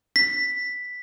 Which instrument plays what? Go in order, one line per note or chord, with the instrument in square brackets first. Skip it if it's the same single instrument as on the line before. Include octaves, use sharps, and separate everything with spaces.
[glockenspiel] B6